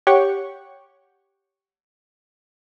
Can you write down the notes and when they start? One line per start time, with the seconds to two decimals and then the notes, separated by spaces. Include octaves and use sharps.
0.07 G4 C#5 F#5 G5 C#6